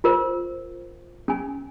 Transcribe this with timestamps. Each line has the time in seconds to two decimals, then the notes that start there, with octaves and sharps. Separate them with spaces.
0.04 F4 A#4 C5
1.28 C#4 G#5